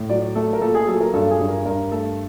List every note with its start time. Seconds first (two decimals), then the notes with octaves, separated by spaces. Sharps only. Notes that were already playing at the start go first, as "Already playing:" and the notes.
Already playing: A2
0.09 F#3 D5
0.35 A3 A4
0.53 A#4
0.62 A#2 A4
0.75 G#4
0.87 F#3 A4
1.01 A#4
1.13 G2 A4
1.31 G#4
1.40 G2
1.48 A#4
1.65 G2 A#4
1.92 A3 A4